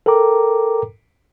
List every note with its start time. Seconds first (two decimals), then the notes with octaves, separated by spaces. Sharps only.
0.06 A4 A#4 G5 A#5 D6